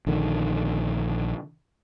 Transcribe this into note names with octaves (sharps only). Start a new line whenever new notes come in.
A#1 D3 D#3